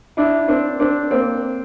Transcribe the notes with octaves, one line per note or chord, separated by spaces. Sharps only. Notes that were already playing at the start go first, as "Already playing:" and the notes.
D4 E4
C4 D4
C4 D4
A#3 C4